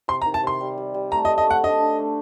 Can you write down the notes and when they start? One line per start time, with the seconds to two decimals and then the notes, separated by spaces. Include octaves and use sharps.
0.08 C3 C6
0.22 A#5
0.25 D#3
0.34 A5
0.43 C3 C6
0.61 G3
0.77 G3
0.94 G3
1.11 A3 A#5
1.25 D#5
1.30 A4
1.38 D#5
1.47 A3 F#5
1.64 D4 D#5
1.80 D4
1.99 A3